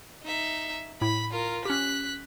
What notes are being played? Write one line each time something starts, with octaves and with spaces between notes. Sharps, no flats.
D#4 E5
A2 E4 B5
F4 A#4
C#4 G4 F#6 B6